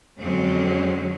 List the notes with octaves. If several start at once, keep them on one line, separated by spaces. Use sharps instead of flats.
F2 D3 F#3 G#3 C4 C#4